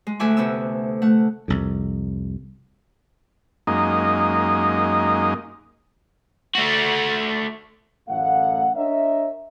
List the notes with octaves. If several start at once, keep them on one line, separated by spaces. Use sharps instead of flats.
G#3
D2 A3 E5 F#5 G#5 D6
D2 C3 B3 E6
A3 F#5
C2 F2
F#2 G#3 A#3 D#4 D#5
A3 F#4
A1 F#2 A3 F5 F#5
D4 A#4 C#5 D#5 E5